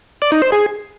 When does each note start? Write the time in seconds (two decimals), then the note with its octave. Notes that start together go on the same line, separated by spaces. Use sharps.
0.22 D5
0.32 D#4
0.42 C5
0.52 G#4